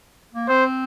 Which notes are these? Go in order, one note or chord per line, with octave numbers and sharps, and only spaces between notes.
A#3
C4 C5